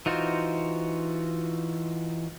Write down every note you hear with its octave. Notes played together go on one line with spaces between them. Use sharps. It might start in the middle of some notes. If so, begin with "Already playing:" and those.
E3 D#4 F4 F#4 C5